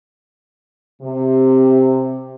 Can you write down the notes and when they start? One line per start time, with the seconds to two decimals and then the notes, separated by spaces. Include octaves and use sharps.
1.02 C3